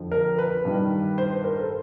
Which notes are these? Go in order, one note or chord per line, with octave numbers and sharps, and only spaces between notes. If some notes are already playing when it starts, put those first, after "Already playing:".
Already playing: F2 D3 F3
A#4
B4
G2 D#3
C5
B4
A#4
A4